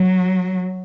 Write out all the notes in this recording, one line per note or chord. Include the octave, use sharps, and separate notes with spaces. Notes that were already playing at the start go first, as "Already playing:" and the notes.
Already playing: F#3